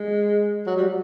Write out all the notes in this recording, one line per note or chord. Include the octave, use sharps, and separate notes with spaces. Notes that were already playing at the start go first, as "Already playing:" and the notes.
Already playing: G#3
F#3
G3